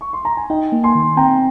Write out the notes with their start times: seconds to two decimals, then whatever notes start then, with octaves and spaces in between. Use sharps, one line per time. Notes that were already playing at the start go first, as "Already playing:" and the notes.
0.01 C#6
0.13 C6
0.25 A#5
0.37 G#5
0.50 D#4 D#5 G5
0.72 A#3
0.83 G#5 C6
0.95 D#3
1.17 C4 G5 A#5